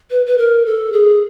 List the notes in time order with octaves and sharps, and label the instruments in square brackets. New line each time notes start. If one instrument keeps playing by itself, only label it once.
[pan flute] B4
B4
A#4
A4
G#4